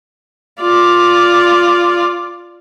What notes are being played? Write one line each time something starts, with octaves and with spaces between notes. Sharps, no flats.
F4 D5